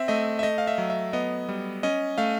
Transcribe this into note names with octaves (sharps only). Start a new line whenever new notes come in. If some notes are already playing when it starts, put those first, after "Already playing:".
Already playing: C4 E5
A3 D#5
E5
A3 D#5
F5
E5
F#3
E5
B3 D#5
G3
C#4 D#5
A3 F5